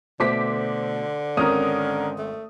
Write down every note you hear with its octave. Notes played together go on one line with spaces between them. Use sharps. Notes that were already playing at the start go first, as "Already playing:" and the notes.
B2 D3 A3 C5 D6 B6
G#1 C4 C#4 A#4 D#6
A3